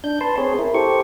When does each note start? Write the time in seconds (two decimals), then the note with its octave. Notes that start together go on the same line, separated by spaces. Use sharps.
0.04 D4 G6
0.21 B4 A5 C6
0.38 C4 G#4 C#5
0.59 E4 A#4
0.74 G4 A4 C5 C#6